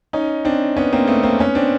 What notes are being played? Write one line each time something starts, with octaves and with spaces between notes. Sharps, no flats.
C#4 D#4
C4 D4
B3 C#4
A#3 C4
A3 B3
A#3 C4
B3 C#4
C4 D4